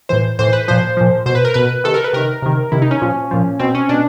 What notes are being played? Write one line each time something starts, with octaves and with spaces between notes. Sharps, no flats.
A2 E3 C5
A2 E3 C5
B4
A#2 F3 C5
A#2 F3
B2 C5
B4
A#4
B2 B4
C3 D#3 A4
A#4
B4
C3 D#3 A#4
C3 D#3
C3 D#3 E4
D#4
C#4
A#2 F3
A#2 F3
B2 C4
C#4
B2 D4